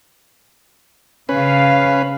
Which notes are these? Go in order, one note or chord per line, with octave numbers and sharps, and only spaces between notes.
C#3 C#4 B4 F5